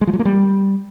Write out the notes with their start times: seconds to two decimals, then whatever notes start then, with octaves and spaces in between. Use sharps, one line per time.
0.01 G#3
0.07 F3
0.13 F#3
0.19 A#3
0.25 G3